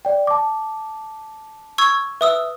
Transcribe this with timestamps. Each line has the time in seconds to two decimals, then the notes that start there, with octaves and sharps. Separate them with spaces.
0.05 D5 G5
0.27 A5 D6
1.78 C#6 E6 G#6
2.21 B4 E5 D#6 E6